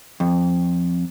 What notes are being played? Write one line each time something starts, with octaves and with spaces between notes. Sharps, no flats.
F2